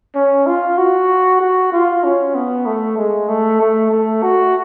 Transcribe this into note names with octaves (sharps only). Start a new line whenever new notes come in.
C#4
F4
F#4
F#4
F4
C#4
B3
A3
G#3
A3
A3
A3
F#4